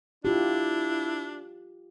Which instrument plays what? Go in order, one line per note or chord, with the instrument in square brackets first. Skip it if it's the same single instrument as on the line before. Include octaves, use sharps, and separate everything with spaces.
[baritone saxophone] D4 [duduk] E4 [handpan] F4 G4